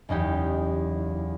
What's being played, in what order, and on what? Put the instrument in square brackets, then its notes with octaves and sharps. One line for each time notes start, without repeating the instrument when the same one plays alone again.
[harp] F#1 E2 D#4 G4